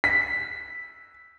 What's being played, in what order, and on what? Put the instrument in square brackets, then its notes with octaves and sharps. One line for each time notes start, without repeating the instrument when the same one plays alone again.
[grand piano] B6